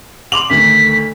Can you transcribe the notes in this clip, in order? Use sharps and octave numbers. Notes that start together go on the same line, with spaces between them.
C6 D6 F#7
D2 D#3 A3 B6